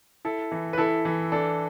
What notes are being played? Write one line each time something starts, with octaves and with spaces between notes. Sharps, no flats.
E4 A4
E3
B4
E4 A4
E3
D4 A4